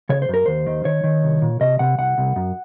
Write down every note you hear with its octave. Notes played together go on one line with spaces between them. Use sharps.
C#3 C#5
C5
F#2 A#4
D#2 C5
D#3
D#3 C#5
D#3
C2
A#2
C3 D#5
C3 F#5
C2 F#5
C2
F#2